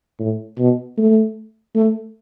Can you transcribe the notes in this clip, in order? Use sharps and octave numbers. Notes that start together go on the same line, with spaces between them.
A2
B2
A3
A3